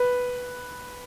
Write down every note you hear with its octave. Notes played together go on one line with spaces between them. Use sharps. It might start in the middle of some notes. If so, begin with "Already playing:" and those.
Already playing: B4